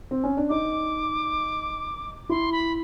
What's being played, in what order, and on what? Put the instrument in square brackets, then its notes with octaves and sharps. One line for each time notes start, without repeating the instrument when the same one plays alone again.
[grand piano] C4
C#4
D4
[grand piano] D#4 [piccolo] D6
[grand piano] E4 [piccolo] C6
[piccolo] B5